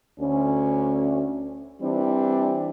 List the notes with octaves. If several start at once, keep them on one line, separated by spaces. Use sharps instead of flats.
D2 C#4
E3 G3 C4 D4